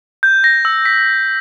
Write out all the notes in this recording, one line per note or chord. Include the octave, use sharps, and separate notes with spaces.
G6
A#6
E6
B6